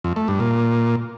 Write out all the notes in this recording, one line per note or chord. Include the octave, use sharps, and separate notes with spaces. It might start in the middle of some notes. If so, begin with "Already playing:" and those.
F2
A3
G2
A#2